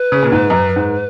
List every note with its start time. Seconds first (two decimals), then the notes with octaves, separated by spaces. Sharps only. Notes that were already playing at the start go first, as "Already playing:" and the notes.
Already playing: B4
0.12 C#3
0.23 A#2
0.32 G#2
0.50 F#2
0.76 G#2